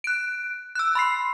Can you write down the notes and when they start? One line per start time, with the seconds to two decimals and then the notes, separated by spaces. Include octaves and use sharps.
0.04 F#6 D7
0.75 E6 F#6
0.95 B5 C6 C7